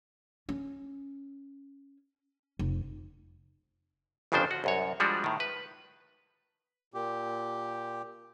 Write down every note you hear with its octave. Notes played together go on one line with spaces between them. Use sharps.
C#4
F1
G1 F2 C#3 F3 D4 C5
F#4
C2 F#2 C#5
F3 G3 G#3 D4 F#4
A2 D#3
B4
A#2 G4